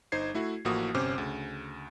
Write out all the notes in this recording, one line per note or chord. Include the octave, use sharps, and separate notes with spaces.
G1 D#4 C5 G#6 C7
A3 E4 F#4
A1 A2 F3 A#3 F#4 D#6
G1 C3 C#4 C5 D6 F6
D2 C#3